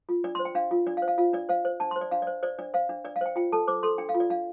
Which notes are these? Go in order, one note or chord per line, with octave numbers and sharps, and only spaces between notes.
F4
D4 D5
C6
C5
G5
D4 F5
F4
D4 D5
F5
C5
F5
F4 F5
D4 D5
C5 F5
C5
D4 A5
C6
C5
D5
D4 F5
D5
C5
C5 D5
D4 D5
C5 F5
D4
D4 D5
F5
C5 G5
F4 G5
A4 A5
C5 D6
A4 C6
D4 G5
F5
F4
D5
D4 F5